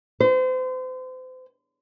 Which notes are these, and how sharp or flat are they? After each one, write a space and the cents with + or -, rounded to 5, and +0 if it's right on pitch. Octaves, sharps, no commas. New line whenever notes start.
C5 -35